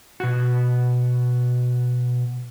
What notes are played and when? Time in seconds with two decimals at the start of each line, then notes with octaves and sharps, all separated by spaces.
0.20 B2 F#4